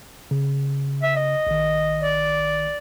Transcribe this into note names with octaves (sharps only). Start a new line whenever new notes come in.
C#3
E5
D#5
A#1 D#3
D5